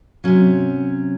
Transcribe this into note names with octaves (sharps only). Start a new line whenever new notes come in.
C3 F#3 C#4